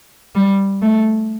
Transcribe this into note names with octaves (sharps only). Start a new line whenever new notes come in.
G3
A3